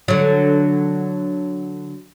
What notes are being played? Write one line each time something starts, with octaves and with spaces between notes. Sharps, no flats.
D3 F#3